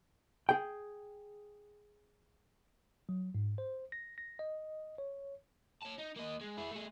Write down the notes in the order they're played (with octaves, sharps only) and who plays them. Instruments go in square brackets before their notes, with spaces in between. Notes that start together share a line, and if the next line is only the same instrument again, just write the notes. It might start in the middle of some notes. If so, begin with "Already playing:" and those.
[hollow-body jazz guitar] G#4 G5
[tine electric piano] F#3
G#2
C5
A#6
A#6
D#5
C#5
[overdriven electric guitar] C#5 A5
D#4
A#3 D#5
G#3
E4 G#4
A3 G#4